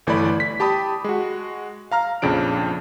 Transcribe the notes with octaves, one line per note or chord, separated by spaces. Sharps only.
G1 E3 A3 D5 B5
B6
G4 A5 B5 D#6
G#3 F#4
F5 A#5 F6
A#1 F2 C#3 D4 D7